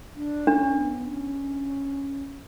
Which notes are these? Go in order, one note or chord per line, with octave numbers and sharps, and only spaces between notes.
D4
C#4 D4
B3
C#4